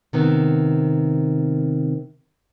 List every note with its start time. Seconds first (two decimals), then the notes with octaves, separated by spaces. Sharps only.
0.13 C3 D#3 B3